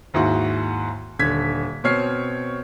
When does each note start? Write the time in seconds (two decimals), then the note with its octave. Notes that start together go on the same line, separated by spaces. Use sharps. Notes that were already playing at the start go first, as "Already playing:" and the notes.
0.14 D#2 G#2 E4 F#4 F#5
1.19 D#1 D3 G#6 B6
1.84 B2 C4 C#5 F6 C7